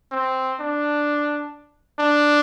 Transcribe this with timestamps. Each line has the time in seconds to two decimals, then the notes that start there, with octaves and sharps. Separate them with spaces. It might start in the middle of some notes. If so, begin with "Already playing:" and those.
0.12 C4
0.60 D4
1.99 D4